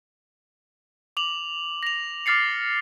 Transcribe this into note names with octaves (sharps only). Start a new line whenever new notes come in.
D6 F7 F#7
A#6 F7
D6 F6 A6 C7 C#7